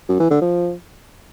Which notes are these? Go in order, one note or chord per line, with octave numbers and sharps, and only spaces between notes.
F#2
E3
D3
F3